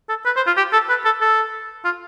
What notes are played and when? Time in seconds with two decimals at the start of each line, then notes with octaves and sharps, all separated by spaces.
0.09 A4
0.26 B4
0.36 C5
0.47 F4
0.57 G4
0.73 A4
0.89 B4
1.05 A4
1.21 A4
1.85 F4